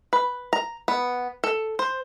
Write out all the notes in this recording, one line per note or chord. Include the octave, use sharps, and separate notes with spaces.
B4
A#5
B3
A4
C5